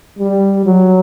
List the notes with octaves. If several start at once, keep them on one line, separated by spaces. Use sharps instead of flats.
G3
F#3